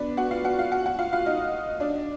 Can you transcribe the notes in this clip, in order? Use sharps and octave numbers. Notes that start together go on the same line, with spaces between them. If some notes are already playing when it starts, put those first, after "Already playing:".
Already playing: B3 D4 B4 D5
F#4 F#5
F4 F5
F#4 F#5
F4 F5
F#4 F#5
F#4 F#5
F4 F5
F4 F5
D#4 D#5
D4 D5